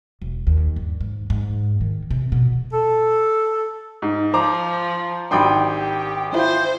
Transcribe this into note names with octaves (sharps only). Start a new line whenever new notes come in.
E1
D#2
G2
G#2
G#2
D#3
C3
B2
A4
G#2
F3 C5 A#5 D6
G#1 D4 F#4 G4 G5 B5 C6
D4 E4 F4 C5